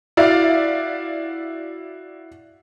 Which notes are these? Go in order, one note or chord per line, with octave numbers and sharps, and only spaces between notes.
E4 F#4 D5 E5 F5